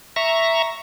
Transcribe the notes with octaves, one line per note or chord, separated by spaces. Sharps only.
E5 A#5 C#6